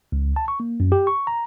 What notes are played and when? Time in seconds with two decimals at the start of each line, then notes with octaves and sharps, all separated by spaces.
0.12 C#2
0.36 A5
0.48 C#6
0.60 A#3
0.80 F#2
0.92 G4
1.07 C#6
1.27 A#5